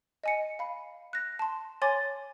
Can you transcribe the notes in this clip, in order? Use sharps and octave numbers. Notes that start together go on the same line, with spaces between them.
D#5 G#5 C#7
F5 B5
F#6 A#6
A5 C6
C#5 G#5 C6 D6 A6